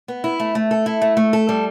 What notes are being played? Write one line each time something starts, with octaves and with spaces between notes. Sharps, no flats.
B3
E4
A3
A3
A4
E4
A3
A3
A4
G3